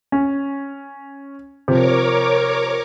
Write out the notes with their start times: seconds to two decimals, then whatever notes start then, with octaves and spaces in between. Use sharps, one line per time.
0.12 C#4
1.68 C3 F3 A#4 C#5 D6